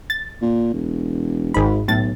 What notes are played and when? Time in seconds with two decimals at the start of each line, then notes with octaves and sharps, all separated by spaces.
0.10 A6
0.42 A#2
0.73 E1
1.54 G#1 G#2 B5
1.88 B1 A2 A6